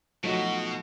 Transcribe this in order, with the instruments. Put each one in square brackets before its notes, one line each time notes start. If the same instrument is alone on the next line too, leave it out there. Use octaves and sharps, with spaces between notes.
[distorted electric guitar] B2 [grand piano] F3 A3 D#4 [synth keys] F#3 [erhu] F#4